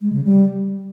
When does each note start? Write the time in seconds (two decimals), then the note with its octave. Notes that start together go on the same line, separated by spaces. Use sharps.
0.01 G#3
0.13 C#3
0.24 G3